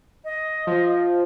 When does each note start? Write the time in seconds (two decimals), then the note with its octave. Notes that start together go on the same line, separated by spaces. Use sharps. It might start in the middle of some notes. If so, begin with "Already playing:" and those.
0.24 D#5
0.67 F3